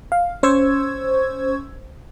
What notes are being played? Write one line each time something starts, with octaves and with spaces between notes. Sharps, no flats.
F5
C#4 C5 C#6 E6 G#6